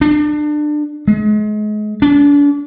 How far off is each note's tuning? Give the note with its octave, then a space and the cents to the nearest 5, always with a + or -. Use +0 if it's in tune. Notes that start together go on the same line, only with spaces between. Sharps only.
D4 +25
G#3 +35
D4 -40